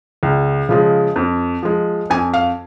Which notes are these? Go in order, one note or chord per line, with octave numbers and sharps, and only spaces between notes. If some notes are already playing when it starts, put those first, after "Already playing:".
C#2
C#3 F3 G#3
F2
F3 G#3
F2 G#5
F5